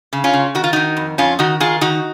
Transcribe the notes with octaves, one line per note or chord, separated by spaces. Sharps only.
C#3
C#4 F4
C#3
D#3 F#4
F4
D#3 D#4 F#4
F2
F2 C#4 F4
D#3 D#4 F#4
D#3 F4 G#4
D#3 D#4 F#4